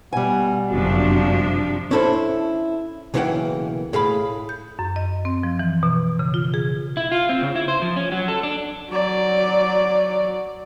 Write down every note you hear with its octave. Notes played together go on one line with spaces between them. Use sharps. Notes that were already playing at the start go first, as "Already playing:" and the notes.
B2 G3 F#5 G#5
G1 F#2 C3 F3 D4 F#4
C#4 D4 E4 A4 C5
B1 C#3 E3 A#3 F#5 G5
A2 G#4 F5 B5
G6
F#2
D#5
C4
F3
E3
B2
C#3
F4
G#4
E4
F4
C4
C#3
E4
C5
F3
C#4
F#3
A4
D4
F#3 D5